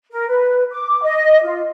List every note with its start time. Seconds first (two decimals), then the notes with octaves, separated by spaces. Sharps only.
0.11 A#4
0.28 B4
0.71 D6
1.02 D#5
1.44 F4